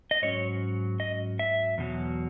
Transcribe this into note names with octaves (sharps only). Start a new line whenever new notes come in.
D#5
G#2 F#3 C#4 C#5
D#5
E5
E2 B2 F#3